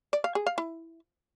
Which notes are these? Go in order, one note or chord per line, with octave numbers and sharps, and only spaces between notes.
D5
F5
G#4
F5
E4